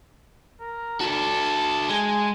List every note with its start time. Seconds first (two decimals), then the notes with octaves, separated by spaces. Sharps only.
0.61 A#4
1.01 F#4 A4 A5
1.89 G#3 G#5